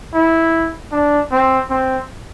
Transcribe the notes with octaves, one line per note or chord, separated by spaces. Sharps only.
E4
D4
C4
C4